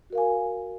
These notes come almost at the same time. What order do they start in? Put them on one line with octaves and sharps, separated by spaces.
F#4 A#4 F5 G#5